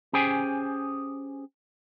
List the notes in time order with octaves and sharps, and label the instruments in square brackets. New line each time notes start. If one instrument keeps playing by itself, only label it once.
[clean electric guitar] C#4 G4 G#4 C5 G5 G#5